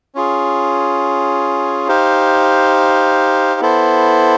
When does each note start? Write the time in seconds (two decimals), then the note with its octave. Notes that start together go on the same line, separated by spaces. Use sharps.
0.15 C#4 F4 G#4
1.88 D#4 G4 C5 F5
3.61 B3 E4 A4 C5